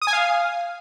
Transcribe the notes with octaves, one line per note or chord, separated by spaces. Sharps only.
D#6
G#5
F5